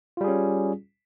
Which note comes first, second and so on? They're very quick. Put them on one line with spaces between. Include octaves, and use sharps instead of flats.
F4 G3 G#4 C#4